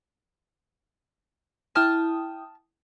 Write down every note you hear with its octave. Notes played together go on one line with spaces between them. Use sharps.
E4 G5 A5 D#6 F6